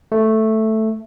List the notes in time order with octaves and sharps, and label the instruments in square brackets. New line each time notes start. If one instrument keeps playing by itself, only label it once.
[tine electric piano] A3